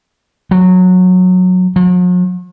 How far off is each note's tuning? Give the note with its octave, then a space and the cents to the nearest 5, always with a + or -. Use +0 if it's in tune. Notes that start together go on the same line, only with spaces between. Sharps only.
F#3 -15
F#3 -45